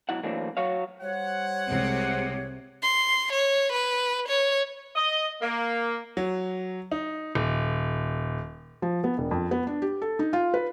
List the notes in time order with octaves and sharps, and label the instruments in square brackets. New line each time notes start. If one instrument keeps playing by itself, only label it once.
[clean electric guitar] B1 F#3 E4 F#5
E3 F#3 A3 A#3 C4 D4
F#3 F#4 C#5 F5
[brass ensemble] G3 C5 F#5 [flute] C#5
[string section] C2 C3 G#3
[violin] C6
C#5
B4
C#5
[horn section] D#5
A#3
[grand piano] F#3
D#4
D#1
[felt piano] F3
B3
E1
F2
B3
D4
G4
A4
D#4
F4
B4